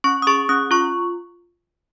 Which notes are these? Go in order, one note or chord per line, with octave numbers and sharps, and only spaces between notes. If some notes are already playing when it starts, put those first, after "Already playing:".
C#4 C#6
D#6
G#4 C#6
C#4 D#6
F4 C#6